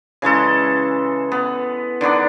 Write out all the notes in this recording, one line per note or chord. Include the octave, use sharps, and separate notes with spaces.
C#3 E3 G#3 A4
B3
D3 D#3 B3 D4